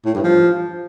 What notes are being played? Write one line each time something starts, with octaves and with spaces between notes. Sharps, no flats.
A2
G2
F3